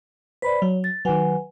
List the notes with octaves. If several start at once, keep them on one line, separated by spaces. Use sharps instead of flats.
B4 C5 D5 B5 B6
F#3 C#5
A6
D#3 F#3 B4 F#5 G#5